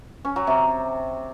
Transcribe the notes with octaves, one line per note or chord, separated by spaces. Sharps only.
C#4
F#3
C3